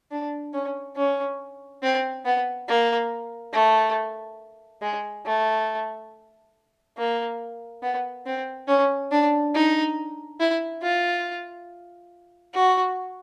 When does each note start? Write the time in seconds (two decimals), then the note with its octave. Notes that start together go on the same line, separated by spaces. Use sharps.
0.11 D4
0.53 C#4
0.96 C#4
1.83 C4
2.25 B3
2.68 A#3
3.53 A3
4.82 G#3
5.26 A3
6.97 A#3
7.83 B3
8.26 C4
8.68 C#4
9.11 D4
9.54 D#4
10.40 E4
10.82 F4
12.54 F#4